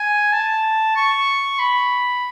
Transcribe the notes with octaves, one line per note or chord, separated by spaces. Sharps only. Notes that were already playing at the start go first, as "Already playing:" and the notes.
Already playing: G#5
A5
C#6
B5